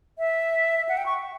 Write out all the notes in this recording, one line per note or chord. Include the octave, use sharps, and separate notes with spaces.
E5
F#5
G5
C#6